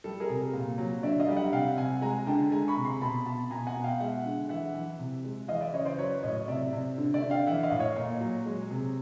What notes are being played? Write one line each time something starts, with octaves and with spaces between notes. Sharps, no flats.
G3 A4
G#4 A#4
C3
A#2
F#3
D3 D5 E5
D#5 F5
G3
E5 F#5
C3 F5 G5
C3 F#5 G#5
G#3 G#5 A#5
D3 G5 A5
G#3 G#5 A#5
B5 C#6
C3
A#5 C6
B2 A5 B5
B2 A5 B5
B2 G#5 A#5
F#5 G#5
B2
F5 G5
G#3 E5 F#5
D3
E3 E5 F#5
E3
C3
G#3
E3 D#5 F5
D5 E5
C#3 C#5 D#5
C5 D5
F#3 B4 C#5
A2 C#5 D#5
C3 D5 E5
C3
D3
D5 E5
D3
F5 G5
E3 E5 F#5
D#5 F5
A2
C#5 D#5
A#2
F#3
G#3
C3